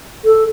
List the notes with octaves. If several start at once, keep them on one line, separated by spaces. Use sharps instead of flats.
A4